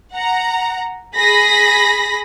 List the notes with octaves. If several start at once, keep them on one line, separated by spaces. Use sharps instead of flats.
F#5 A#5
G#4 B5 A#6 B6